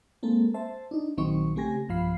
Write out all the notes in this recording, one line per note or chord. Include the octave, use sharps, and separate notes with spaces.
G#3 A#3 C4 A4
C5 E5 A5
D4 D#4
A#1 D#3 F#3 C4 D#4 C#6
C#3 A3 C4 G4 G#5 A#6
B1 G2 F3 F5 B5 C7